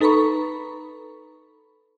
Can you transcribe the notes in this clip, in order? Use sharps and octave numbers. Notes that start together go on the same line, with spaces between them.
D#4 A4 B4 A#5 B5 C#6